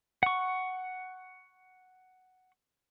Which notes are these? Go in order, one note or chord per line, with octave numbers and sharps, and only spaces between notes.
F#5 C#6